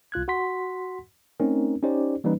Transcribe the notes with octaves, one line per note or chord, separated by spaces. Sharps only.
C2 F4 F#6 G#6
F#4 F#5 C6 B6
A3 C4 C#4 D#4 A#4
C#4 D#4 G4 C5 D5
E3 G3 A#3 C#4 D#4 B4